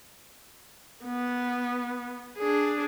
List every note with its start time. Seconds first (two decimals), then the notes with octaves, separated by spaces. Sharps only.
1.05 B3
2.38 D4 G#4